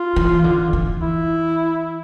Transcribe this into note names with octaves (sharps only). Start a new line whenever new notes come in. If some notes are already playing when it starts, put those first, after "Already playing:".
Already playing: F4
E3
D3
E3
E4